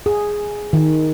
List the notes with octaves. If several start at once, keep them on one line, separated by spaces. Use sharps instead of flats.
G#4
D#3